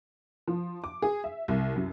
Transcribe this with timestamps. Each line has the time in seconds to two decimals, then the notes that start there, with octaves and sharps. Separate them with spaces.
0.48 F3
0.84 D6
1.02 G#4
1.24 E5
1.48 C2
1.76 F#2